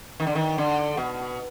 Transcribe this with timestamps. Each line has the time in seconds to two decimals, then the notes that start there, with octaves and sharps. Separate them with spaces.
0.20 D#3
0.27 D3
0.35 D#3
0.58 D3
0.97 B2